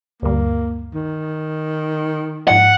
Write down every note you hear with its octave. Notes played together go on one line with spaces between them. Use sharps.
D2 G2 A#3
D#3
G#2 F3 F#5